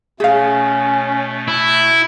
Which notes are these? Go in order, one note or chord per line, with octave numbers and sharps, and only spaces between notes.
B2 A3 C#4 G#4 F5
E4